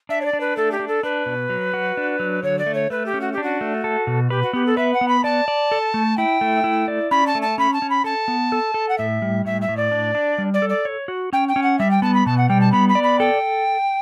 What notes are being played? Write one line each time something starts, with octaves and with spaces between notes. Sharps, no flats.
D4 E5
C#5
D5
D4
B4
A3 A4
G4
D4
A4
D4 B4
B2
F#3
F#4
D4
F#3
D3 C#5
D5
A3
C#5
A3 B4
G4
C#4
F#4
D4 G4
F#4
A3
A4
B2
G4 B4
F#4
B3 G4
A4
B4 E5
F#5
B3
B5
D5 A5
D5
A4
A3
E4 G5
A3
E4
D5
C#4 B5
A5
A3
A5
C#4 B5
A5
C#4
B5
A4 A5
B3
A4
A4
F#5
A2 E5
G3
A2 E5
E5
A2
D5
D4
D4
G3
D5
A4
D5
C#5
F#4
C#4 G5
G5
C#4
F#5
G3 E5
G5
B3 A5
B5
B2 A5
F#5
G3 G5
A5
B3 B5
B5
D5
B5
A4 G5